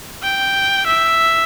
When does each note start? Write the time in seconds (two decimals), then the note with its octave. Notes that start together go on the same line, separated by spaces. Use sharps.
0.23 G5
0.87 E5